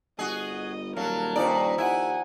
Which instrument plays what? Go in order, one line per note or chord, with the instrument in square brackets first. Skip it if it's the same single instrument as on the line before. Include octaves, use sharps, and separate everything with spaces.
[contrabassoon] G1 [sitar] F#4 G#4 [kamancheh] D#5
[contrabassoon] D#1 [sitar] F#3 [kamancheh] A#4 A5 [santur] F5
[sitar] G2 D5 [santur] F3 C#4 D#4
[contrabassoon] D#2 [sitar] E4 [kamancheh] F#5 G#5 [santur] C6